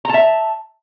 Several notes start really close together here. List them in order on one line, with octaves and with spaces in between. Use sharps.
A#5 A5 E5